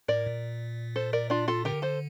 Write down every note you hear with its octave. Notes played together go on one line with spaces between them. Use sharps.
A2 A#4 D5
A#2
A4 C5
A#4 D5
D4 F4
F4 A4
D3 G4 A#4
A4 C5